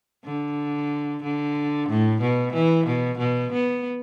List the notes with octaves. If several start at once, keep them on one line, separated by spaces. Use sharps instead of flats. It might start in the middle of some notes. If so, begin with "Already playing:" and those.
D3
D3
A2
B2
E3
B2
B2
B3